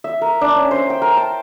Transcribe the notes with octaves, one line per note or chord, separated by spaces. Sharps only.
E5
A#4
D4
C#4
C5
G5
A#4
A5